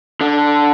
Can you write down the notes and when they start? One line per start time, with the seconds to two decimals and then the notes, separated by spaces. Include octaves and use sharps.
0.21 D3